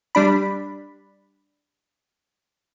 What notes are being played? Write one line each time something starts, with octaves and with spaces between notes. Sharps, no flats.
G3 D4 B5